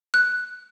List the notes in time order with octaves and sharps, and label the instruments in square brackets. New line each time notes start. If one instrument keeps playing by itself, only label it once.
[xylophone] F#6